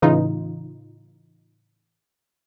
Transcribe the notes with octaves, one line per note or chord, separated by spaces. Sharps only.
A2 C#3 E3 D#4 F4